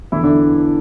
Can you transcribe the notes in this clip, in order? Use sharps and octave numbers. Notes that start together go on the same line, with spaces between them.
E2 D3 E3 F#3 E4
D3 D4